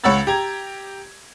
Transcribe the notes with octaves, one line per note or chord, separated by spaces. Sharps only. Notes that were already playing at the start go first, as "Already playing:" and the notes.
C#2 C#5 F#5 B5 E6 A6
G4 A#5 G#6